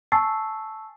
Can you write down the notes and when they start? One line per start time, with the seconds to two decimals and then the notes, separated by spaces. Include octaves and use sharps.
0.12 G#5 A5 C#6 E6 A6 C7